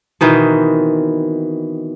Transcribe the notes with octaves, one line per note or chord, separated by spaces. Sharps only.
B2 D#3 E3 C4